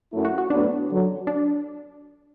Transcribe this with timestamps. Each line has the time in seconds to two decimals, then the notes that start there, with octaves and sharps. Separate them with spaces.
0.12 F#2 F#3 A3 E4
0.25 F#4
0.38 F#4
0.50 A2 F#3 B3 D4
0.89 F#2 D3 F#3
1.27 D4